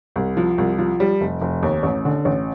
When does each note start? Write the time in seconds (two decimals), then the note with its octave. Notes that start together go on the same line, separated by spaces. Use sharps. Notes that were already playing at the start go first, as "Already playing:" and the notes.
0.16 C2
0.37 F3
0.58 C2
0.78 F3
1.00 G3
1.21 F1
1.41 F1
1.63 D#2
1.83 A1
2.05 D3
2.25 A1